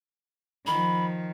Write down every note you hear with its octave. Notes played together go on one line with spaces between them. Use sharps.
D#3 F3 B5